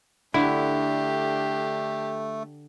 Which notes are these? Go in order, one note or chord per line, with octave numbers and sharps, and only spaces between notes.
D3 A3 D4 E4 G4